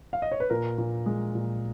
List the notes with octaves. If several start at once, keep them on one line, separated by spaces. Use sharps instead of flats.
F5
D#5
C#5
B4
A#2 A#4
A#2
G#3
A#2